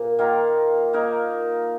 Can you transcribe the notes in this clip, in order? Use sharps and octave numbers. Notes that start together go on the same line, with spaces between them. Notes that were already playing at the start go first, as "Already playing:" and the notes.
Already playing: A#2
D#3 A#3 F4 A#4
A#3 D#4 A#4